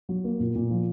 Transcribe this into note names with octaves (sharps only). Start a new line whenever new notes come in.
F#3
A#3
A#2
A#2
F3